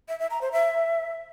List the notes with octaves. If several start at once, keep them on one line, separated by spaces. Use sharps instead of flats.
E5
E5
A#5
C5
E5